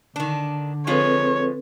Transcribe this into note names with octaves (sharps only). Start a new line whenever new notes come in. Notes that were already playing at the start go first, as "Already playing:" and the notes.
D3 D#3 D4
F3 G#3 C4 A4 B4 C#5